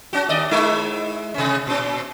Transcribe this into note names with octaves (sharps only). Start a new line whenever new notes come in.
C#4 F#4
D#2 D5 D#5
G#3 D#4 E4
C3 C#4
A#2 C#4